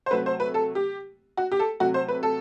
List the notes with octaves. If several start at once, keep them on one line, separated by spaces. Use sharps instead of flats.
C5
C3 F#3 A3 B4
C5
B4
A4
G4
F#4
G4
A4
C3 F#3 A3 F#4
C5
B4
A4